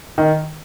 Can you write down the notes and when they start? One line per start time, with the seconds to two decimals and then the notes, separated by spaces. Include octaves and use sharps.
0.18 D#3